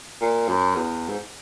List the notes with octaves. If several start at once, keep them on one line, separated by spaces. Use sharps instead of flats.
A#2
F#2
E2
G#2